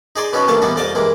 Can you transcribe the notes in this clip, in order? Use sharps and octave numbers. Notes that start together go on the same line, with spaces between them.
D#4 G#4 D5 C6
B2 B3 C#4 D#4 F#4
A#1 D#2 A2 A#3 A4 F5
E3 G3 B3 D4 D#4
C2 F2 D5 D#5 F5 A5
G2 E3 G#3 A#3